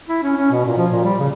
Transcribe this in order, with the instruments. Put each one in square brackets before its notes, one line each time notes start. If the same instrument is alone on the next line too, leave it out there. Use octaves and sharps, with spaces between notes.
[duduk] E4
C#4
C#4
B2
A#2
F3
A#2
G3
C#3